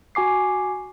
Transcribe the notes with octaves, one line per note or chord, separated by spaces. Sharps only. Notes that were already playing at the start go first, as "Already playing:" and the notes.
F#4 G#5 D6 C7